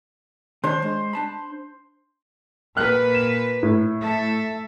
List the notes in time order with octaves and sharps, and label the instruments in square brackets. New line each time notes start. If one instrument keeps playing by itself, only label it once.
[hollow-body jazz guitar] D#3 D4 C#5 [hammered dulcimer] C5
[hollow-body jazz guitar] G#3
D4 A5 B5
[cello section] A#2 B4 [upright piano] F6 F#6
[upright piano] E7
A2
[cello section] A3 A4 E5